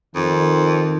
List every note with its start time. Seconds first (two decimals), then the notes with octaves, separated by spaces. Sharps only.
0.15 F2 D#3